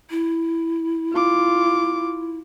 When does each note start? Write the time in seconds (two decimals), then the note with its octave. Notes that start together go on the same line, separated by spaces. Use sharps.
0.10 E4
1.12 F4 D6